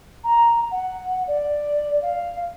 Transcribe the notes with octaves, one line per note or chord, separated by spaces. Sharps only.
A#5
F#5
D5
F5